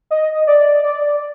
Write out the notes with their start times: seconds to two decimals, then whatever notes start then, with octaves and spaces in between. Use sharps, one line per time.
0.11 D#5
0.47 D5
0.84 D5